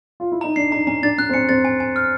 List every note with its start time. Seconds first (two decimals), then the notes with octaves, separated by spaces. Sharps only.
0.20 F4
0.32 E4
0.41 D#4 A#5
0.56 D4 C7
0.72 D#4 A#5
0.87 C#4 A#5
1.03 D4 A6
1.18 C#4 F#6
1.29 C4
1.34 C#4 C#7
1.49 C4 A6
1.65 G#5
1.80 G#5
1.96 F6